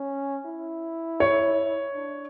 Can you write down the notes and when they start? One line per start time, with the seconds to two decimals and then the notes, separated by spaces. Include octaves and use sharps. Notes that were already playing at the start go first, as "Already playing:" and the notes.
Already playing: C#4
0.46 E4
1.20 C#5
1.94 D4